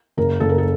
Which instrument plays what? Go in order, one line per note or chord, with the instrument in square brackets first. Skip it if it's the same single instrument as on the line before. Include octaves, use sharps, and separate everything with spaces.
[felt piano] F#1 A#4
F#1 A4
A#4
A4